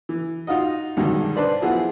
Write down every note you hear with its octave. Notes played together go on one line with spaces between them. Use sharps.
E3
D#4 F4 F#4 D#5
G2 B2 D3 D#3 F#3 G#3
D4 B4 C5 D5
F3 F#3 B3 E4 G#4